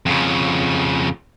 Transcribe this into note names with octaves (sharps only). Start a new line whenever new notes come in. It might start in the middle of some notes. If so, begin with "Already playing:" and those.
F2 C#3